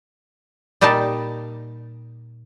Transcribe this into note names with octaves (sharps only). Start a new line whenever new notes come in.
A#2 G3 D#4 G4 A5